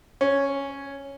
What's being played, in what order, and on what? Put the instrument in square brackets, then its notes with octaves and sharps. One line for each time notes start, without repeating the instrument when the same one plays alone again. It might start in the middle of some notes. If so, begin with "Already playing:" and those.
[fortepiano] C#4